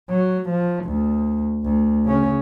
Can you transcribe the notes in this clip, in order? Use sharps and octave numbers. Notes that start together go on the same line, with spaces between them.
F#3
F3
D2
D2
C#3 C#4